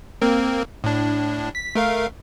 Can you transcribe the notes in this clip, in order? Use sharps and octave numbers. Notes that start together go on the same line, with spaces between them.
A#3 C4 A#4
A2 D4
B6
A3 A#4 F5